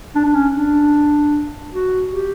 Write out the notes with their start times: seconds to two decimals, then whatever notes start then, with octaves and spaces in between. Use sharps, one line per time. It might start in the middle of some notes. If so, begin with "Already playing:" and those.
0.15 D4
0.26 D4
0.35 C#4
0.55 D4
1.73 F#4
2.11 G4